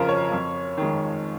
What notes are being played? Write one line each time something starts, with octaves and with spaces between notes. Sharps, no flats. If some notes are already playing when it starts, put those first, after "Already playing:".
Already playing: F2 C#3 F3 F4 A#4
C#5
F2
D#3 G#3